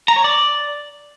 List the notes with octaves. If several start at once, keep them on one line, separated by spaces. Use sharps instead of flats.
A#5
C#5
D5